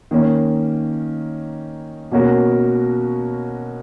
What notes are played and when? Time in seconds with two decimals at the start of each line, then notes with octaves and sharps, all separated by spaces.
0.11 D#3 A#3 C#4
2.11 B2 A#3 C#4 F#4 A#4